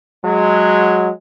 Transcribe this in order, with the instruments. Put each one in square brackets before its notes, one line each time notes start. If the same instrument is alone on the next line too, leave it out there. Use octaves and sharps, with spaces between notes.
[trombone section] F#3 G#3